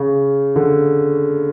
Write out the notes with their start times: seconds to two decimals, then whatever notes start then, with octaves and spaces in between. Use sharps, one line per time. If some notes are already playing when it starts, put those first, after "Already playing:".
Already playing: C#3
0.56 D3